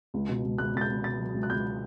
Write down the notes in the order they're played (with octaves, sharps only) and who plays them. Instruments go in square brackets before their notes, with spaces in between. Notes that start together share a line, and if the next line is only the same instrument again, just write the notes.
[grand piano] C#2
B2
C#2
C#2 F#6
C#2 A6
G6
C#2
B2 A6
F#3
C#2
F#6
C#2 G6